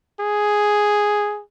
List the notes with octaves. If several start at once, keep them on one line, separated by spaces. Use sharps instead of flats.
G#4